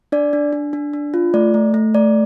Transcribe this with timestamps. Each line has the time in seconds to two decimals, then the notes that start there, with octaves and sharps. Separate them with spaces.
0.12 D4 D5
0.33 D4
0.53 D4
0.73 D4
0.93 D4
1.14 F4
1.34 A3 D5
1.54 A3
1.74 A3
1.94 A3 D5